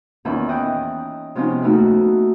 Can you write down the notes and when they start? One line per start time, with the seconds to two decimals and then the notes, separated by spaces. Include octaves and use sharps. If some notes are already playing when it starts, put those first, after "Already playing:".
0.25 E2 A#2 D#3 C#4 E5 B5
0.48 E3 D#5 G5 F#6 G6
1.35 C3 F3 B3 C#4 D#4 F4
1.62 A3 A#3 D#4 E4 F#4 B4